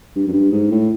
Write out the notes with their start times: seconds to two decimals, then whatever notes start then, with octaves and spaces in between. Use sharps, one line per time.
0.16 G2
0.27 F#2
0.33 G2
0.52 G#2
0.71 A2